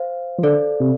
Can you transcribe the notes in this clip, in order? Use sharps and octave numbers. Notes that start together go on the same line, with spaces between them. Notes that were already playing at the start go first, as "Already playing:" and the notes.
Already playing: C5 F5
F3
D3 A4 D5
C3